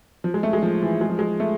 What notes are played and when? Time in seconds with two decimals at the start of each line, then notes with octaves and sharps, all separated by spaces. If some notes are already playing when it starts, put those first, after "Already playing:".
0.24 F3
0.34 G#3
0.43 A3
0.53 G#3
0.63 F3
0.82 E3
1.01 G#3
1.10 F3
1.19 G#3
1.40 A3